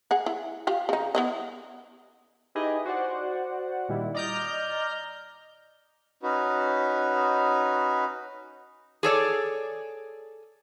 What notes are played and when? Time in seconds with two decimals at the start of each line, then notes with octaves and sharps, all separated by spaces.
0.11 G#4 F#5
0.26 E4
0.67 F4 G4 F5
0.89 C#3 D#4
1.15 B3 E4 D#5
2.55 D#4 E4 G4 G#4 B4 D#5
2.85 F#4 C5 D5 F#5
3.88 A#2 D#3 G3 E4
4.14 D5 D#5 A#5 F6 G6
6.23 C#4 D#4 F#4 B4
9.03 G#4 A4 C#5 D5